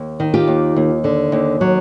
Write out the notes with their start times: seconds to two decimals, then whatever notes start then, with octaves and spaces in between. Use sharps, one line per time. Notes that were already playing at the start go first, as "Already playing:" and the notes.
Already playing: D#2
0.20 D#3
0.34 F4 G4
0.47 D#2
0.76 D#2
1.04 D3
1.32 D#2
1.61 F#3